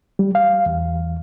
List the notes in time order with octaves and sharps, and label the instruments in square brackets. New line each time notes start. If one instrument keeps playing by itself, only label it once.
[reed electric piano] G3
F5
E2